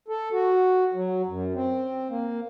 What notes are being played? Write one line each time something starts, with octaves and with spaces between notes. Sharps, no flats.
A4
F#4
F#3
F#2
C4
A#3